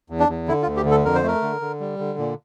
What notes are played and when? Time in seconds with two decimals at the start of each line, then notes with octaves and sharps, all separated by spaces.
0.10 E2
0.19 D4
0.29 E2
0.48 D3 E4
0.62 F4
0.67 D2
0.77 G4
0.85 D3
0.91 A4
1.05 F2 A#4
1.15 C5
1.23 A3 A#4
1.42 D3
1.61 D3
1.80 G3
1.99 D3
2.19 A#2